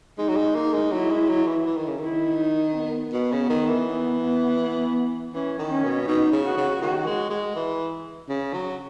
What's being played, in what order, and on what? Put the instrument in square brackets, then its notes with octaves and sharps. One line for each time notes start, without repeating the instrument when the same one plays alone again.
[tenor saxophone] G#3 [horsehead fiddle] D#4
[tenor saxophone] F#3
G#3
A#3
G#3
[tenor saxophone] F#3 [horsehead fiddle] E4
[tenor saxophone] G#3
F#3
E3
E3
D#3
C#3
[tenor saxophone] D#3 [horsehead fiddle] E4
[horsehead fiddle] D#4
B3
[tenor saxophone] B2 [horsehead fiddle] B3
[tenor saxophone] C#3
D#3
E3
[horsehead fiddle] B3
B3
B3
[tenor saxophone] E3 [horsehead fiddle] C#4
[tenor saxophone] D#3
[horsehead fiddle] C#4
[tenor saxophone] B2
[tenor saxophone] B2 [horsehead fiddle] D#4
[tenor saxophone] C#3
[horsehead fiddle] F#4
[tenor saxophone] C#3
[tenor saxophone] D#3 [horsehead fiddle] F#4
[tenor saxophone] G#3
G#3
E3
C#3
F#3